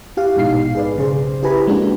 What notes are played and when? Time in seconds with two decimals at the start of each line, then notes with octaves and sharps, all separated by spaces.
0.17 E4 G4 F5
0.36 A#1 G#2 B2 D#4 F5 C7
0.75 G#4 B4 D5
0.96 B1 C#3 G#4 C5
1.43 E4 G4 B4 G#5 A#5 B5
1.67 G#3 A#3 C#4 D4 F#4